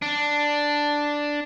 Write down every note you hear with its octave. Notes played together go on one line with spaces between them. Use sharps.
D4